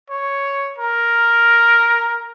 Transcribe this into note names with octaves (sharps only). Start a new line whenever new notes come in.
C#5
A#4